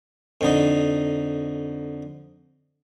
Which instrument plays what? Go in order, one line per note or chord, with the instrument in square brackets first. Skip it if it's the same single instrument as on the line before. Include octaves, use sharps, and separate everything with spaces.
[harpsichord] F2 D3 D#4